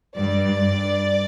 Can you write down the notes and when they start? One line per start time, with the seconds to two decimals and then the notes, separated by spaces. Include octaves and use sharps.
0.16 G2 D5
0.61 G2